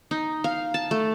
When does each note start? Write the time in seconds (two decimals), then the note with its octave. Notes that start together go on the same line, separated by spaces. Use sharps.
0.11 D#4
0.44 F5
0.74 A5
0.91 A3